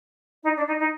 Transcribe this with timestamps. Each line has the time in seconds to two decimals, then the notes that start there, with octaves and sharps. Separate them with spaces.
0.43 D#4
0.56 D4
0.67 D#4
0.78 D#4